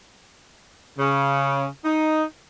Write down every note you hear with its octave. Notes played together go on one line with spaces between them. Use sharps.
C#3
D#4